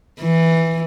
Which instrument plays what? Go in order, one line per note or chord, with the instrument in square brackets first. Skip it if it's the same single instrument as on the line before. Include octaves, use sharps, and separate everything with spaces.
[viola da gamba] E3